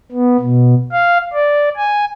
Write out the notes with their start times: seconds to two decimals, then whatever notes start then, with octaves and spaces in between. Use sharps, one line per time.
0.12 B3
0.40 B2
0.92 F5
1.34 D5
1.76 G#5